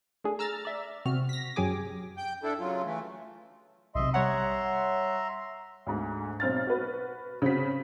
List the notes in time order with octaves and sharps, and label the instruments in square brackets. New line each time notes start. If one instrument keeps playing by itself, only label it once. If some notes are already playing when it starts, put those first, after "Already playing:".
[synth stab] A3 D4 G#4
A#5 E6 F6 A6
D5 E5
C3 C4 F#4 F6
A#6 B6
F#2 F#3 G4 G#4 G#5 D6
[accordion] G5 G6
D4 E4 A4
C#3 F#3 F4
E3 A3
[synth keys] B1 C3 [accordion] D#5 E5 C6
[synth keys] G3 C#5 F#5 [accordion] E5 A#5 C6
[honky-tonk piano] D2 G#2
B1 C4 F6 A6
F#4 B4
C#3 C4 F#4 B6